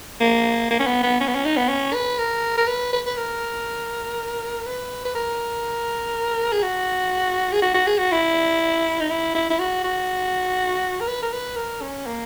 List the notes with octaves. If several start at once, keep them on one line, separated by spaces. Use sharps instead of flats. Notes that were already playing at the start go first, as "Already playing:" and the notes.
A#3
A#3
C#4
B3
B3
C#4
B3
C#4
D#4
B3
C#4
B4
A#4
A#4
B4
B4
B4
A#4
B4
B4
A#4
G#4
F#4
G#4
F#4
F#4
G#4
F#4
E4
D#4
E4
E4
E4
F#4
F#4
A#4
B4
A#4
B4
A#4
C#4
A#3